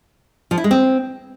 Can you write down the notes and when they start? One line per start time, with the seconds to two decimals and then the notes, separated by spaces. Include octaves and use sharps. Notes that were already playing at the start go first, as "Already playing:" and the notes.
0.51 F3
0.58 E4
0.64 G#3
0.71 C4